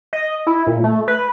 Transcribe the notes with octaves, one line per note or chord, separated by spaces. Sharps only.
D#5
E4
A#2
A3
B4